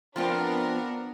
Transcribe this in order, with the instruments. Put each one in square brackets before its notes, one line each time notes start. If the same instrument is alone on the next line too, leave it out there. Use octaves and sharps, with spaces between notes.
[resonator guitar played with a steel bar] F3 C4 F4 [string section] B3 D4 A#4